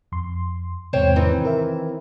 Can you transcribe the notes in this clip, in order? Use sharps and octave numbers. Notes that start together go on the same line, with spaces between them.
F2 C6
E2 G#2 C3 C5 C#5 G5
D#3 E3 C4
A#4 E5